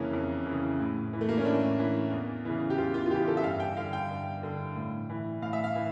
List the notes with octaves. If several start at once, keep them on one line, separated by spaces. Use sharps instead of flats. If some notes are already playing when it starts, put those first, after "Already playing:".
Already playing: F2 C#3 E3 A#3 C#4
F2
C#3 E3
A2
E3
A3
A#3
C#4
A2 D4
E3
E2
C#3 E3
G4
E2 F4
F4
F4
C#3 E3 G4
A4
E5
G2 F5
G5
D3 F5
G5
G2
D3
A2
E3
A2 F5
E5
F5
E3